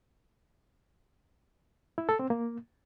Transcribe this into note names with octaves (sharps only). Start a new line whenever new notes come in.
E4
A4
C4
A#3